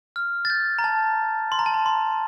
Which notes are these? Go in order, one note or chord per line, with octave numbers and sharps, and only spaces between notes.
F6
A6
G6
A#5
A5
C6
A#5
A5
A#5
C6